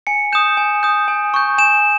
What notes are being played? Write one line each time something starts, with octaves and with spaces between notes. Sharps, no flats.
G#5 C#7
D#6 G6 E7
G#5
D#6 G6
G#5
C#6 G6
G#5 E7